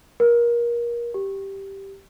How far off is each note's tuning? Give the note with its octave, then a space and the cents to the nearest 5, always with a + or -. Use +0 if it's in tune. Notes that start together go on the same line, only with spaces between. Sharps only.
A#4 +25
G4 -5